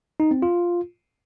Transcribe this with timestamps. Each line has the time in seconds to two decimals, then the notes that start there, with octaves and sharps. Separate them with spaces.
0.20 D#4
0.31 C4
0.42 F4